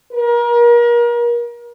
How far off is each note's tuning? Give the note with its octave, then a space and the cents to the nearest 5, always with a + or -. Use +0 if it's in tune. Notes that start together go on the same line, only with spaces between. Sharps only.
A#4 +35